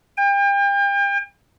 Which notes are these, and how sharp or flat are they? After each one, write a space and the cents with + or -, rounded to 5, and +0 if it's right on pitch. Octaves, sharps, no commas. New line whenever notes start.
G5 +35